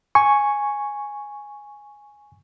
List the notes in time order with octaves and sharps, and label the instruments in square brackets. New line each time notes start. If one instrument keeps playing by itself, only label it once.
[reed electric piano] G#5 C#6